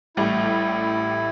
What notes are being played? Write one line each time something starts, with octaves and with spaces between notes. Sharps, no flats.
A1 A2 G3 E4